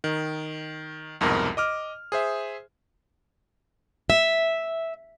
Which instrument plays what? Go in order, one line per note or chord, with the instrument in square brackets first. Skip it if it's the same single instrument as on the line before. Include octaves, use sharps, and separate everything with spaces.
[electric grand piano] D#3
C2 F2 G#2 B2 A#4
D#5 D6 F6
G#4 C5 E5
[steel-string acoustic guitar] E5